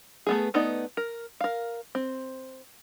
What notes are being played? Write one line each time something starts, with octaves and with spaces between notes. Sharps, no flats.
A3 B3 G#4
A3 B3 D#4 D5
A#4
A#4 F5
C4